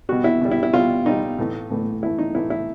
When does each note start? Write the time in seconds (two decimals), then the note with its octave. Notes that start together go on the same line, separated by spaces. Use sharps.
0.09 B2 G3 F#4
0.24 E4
0.41 B2 G3
0.51 E4
0.63 E4
0.73 B2 G3 F4
1.05 B2 G3 D#4
1.38 A2 E3 A3
1.70 A2 E3 A3
2.03 A2 E3 A3 E4
2.18 D#4
2.35 A2 E3 A3 E4
2.50 E4